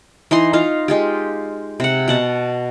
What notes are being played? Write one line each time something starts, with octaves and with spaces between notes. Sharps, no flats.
E3 D#4 D#5 C6
D#4 F4 F5
G#3 F4 G4
C3 F#5
B2 F#5 A5